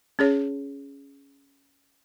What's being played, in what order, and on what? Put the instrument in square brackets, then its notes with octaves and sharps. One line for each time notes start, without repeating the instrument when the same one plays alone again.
[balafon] C#4 G#4 C#5